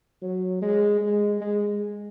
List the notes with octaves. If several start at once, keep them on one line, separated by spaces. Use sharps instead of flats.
F#3
G#3
G#3
G#3